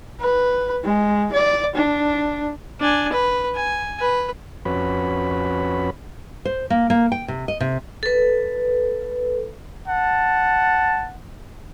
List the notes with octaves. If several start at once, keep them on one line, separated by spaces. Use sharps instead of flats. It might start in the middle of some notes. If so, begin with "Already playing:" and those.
B4
G#3
D5
D4
D4 G#5
B4
G#5
B4
F2 C#4 F#4 B4 B5
C5
A#3
A#3
G5
C3
D#5
C3
A4 B4
F#5 A5